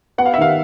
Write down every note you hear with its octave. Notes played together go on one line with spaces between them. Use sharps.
B3 F#5
F5
E5
D#3 F5